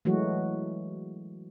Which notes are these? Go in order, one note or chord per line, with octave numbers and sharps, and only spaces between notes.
E3 F#3 G#3 A3 F#4